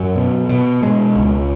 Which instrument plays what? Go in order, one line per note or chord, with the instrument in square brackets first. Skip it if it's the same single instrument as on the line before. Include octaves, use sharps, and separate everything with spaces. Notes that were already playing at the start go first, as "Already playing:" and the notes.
Already playing: [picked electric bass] F#2 F#3
B2
B2
B2 G#3
C#2